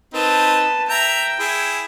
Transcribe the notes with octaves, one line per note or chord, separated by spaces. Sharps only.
C4 D#4 B4 A5
E5 G5 A#5
E4 G#4